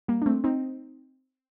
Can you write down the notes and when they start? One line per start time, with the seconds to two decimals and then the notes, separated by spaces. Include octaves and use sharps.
0.08 G3 A#3
0.22 D4
0.26 A3 C4
0.44 C4 D#4